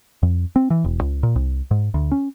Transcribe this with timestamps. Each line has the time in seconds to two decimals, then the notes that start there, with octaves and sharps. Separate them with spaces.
0.23 F2
0.56 C4
0.70 E3
0.84 E1
1.01 C#2
1.23 A#2
1.36 C2
1.71 G#2
1.94 D2
2.12 C#4